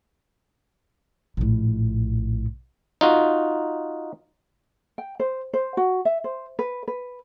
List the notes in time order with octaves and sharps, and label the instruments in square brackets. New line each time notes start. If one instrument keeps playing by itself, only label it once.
[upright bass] A#1 A2
[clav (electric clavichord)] D#4 F4 F#4
[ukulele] G5
C5
C5
F#4
E5
C5
B4
B4